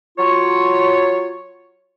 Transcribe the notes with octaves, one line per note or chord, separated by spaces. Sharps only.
F#3 F4 C#5